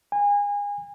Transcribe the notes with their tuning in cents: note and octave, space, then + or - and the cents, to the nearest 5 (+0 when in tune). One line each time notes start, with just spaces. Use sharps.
G#5 -30